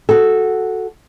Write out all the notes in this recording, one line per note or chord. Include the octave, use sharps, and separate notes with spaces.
F#4 A4